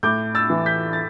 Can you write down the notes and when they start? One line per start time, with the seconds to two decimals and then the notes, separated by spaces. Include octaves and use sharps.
0.03 A2 D6 G6
0.35 E6 A6
0.50 E3
0.66 G6 B6
0.93 A6